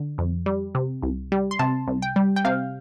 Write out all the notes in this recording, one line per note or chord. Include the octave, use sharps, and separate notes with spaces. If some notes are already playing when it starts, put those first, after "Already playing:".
Already playing: D3
F2
G3
C3
C2
G3
C6
C3 A5
C2
G5
G3
G5
C3 F5